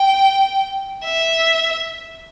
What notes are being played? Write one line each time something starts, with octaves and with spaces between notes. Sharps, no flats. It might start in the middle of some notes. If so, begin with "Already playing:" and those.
Already playing: G5
E5